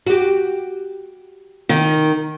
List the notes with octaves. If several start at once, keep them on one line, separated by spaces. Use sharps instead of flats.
F#4 G4
D#3